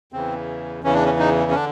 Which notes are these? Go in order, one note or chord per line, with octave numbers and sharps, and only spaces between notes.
E2 C#3 E3 C4
E2 C#3 E3 C#4
D4
C#4
D#4
C#4
D3 D4